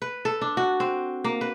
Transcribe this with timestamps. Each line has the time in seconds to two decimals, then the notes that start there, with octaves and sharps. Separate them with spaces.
0.02 B4
0.25 A4
0.41 D4
0.57 F#4
0.80 C4
1.24 A#3
1.41 B4